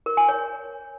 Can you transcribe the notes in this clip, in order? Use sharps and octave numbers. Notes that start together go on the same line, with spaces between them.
A#4
G#5
C#5